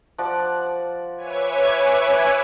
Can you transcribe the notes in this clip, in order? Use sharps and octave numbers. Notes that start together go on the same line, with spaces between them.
F3 D5 F#5
B4 C#5 E5 G#5 D6 G#6